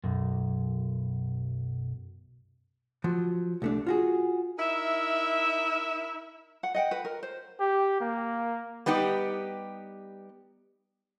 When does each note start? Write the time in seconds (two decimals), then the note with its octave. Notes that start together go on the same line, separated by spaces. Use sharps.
0.04 B1 F#2
3.04 F3 F#3
3.62 C2 A3 D4
3.87 F4 F#4 G#4
4.59 D#4 E4 A#4 E5
6.63 F#5
6.74 D#5 F#5 G5
6.91 B4
7.05 A#4
7.23 C5
7.60 G4
8.01 A#3
8.86 G3 B3 D#4 G4